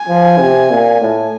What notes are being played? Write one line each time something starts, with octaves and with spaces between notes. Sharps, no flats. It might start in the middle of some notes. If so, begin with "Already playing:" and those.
Already playing: G#5
F3
C3
A#2
A2